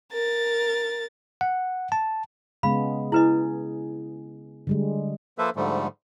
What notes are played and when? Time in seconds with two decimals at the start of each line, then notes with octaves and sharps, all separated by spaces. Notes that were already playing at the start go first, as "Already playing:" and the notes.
0.12 A#4 A6
1.41 F#5
1.92 A5
2.63 C#3 G#3 B3 F5 B5
3.12 E4 G#4 B4 D#5
4.67 D3 G3 G#3
5.38 F3 A#3 A4 B4 C5 E5
5.56 G#2 D3 F3 G3 A3